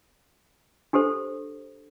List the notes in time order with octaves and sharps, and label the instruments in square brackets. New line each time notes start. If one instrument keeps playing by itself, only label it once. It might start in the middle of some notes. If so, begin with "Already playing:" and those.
[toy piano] D4 G4 A4 C5